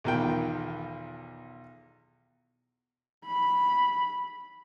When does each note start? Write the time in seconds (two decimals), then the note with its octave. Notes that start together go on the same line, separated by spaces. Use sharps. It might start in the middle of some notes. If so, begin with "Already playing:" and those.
0.04 B1 E2 D#3 F4 G5
3.26 B5